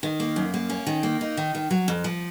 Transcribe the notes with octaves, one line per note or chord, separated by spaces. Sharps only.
D#3
A#3
F#2
A#3
C#4
D#3
A#3
D#4
D#3
D#3
F#3
F2
F3